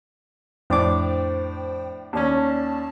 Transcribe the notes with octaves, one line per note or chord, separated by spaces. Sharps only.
F2 A2 D4 C5 G5 D6
D#2 C#4 D5 A5